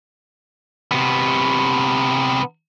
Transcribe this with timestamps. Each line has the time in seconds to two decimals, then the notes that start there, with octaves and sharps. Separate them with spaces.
0.92 C3 B3